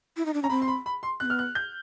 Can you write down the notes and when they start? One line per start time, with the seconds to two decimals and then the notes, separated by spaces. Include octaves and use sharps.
0.17 E4
0.26 D#4
0.34 D4
0.42 C#4 A#5
0.50 C4 B5
0.62 C6
0.68 B5
0.86 B5
1.03 C6
1.20 C4 F#6
1.25 B3 F6
1.39 F#6
1.55 G6